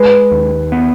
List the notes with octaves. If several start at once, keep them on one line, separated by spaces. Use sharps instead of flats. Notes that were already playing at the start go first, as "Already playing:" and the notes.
Already playing: G#3 B4
D#2
B3